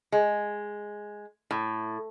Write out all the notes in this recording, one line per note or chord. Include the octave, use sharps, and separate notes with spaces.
G#3
A2